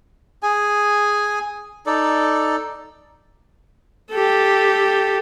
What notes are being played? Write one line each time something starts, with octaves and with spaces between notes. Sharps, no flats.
G#4 G#5
D#4 A4 D5
G4 A4